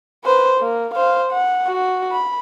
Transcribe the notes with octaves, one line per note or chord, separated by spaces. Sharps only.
B4 C5
A#3
C5 F5
F#5
F#4
B5